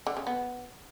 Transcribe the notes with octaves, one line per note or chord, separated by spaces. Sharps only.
D3
C#3
B3